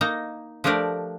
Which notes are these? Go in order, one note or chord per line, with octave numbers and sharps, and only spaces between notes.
A#3 D#4 A#5
F3 A3 D4 G4 A#4 D5